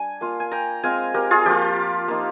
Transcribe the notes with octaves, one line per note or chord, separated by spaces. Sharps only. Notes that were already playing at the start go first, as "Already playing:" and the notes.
Already playing: G3 D4 G#5
A#3 F4
G#5
G5 A#5
G#3 C4 F4 F5 G#5
G4 A#4
F4 G#4
F3 A#3 F4 G4
A#3 D#4